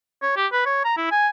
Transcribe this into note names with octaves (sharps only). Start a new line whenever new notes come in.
C#5
G4
B4
C#5
A#5
E4
G#5